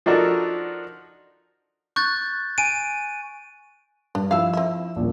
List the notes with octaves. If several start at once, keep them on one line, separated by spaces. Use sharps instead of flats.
F3 D4 D#4 F#4 A4 A#4
C#6 F#6 G6 A6
G#5 D7 D#7
G2 D4
F3 E4 F5 E6
C4 E5
D#1 A#1